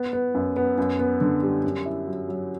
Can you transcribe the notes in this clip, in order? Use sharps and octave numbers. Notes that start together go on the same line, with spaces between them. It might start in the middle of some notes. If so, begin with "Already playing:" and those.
Already playing: B3
B3
F#2
B3
F#2
B3
D3
G3
F#2
E4
F#3
F#3